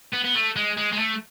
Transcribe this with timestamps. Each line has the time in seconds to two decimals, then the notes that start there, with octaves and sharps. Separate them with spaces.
0.13 B3
0.24 B3
0.35 A3
0.56 G#3
0.78 G#3
0.93 G#3
0.99 A3